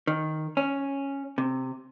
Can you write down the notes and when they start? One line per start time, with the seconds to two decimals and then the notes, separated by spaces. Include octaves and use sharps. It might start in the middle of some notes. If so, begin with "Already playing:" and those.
0.07 D#3
0.57 C#4
1.38 C3